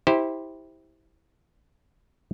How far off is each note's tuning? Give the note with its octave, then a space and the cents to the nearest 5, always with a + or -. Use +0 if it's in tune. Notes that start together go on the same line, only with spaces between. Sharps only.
E4 -20 G4 +5 C5 +0